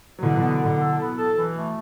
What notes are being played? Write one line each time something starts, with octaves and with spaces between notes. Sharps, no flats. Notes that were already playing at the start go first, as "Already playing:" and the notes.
F#3
B2 D3 E3
F#3
B2 E3 B3
B2 D3
A4
B3
A4
E3
A3